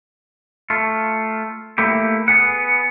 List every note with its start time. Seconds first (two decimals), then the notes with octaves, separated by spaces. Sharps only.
0.70 A3 F4
1.78 A3 A#3 E4 G4
2.28 B3 G#4 F#5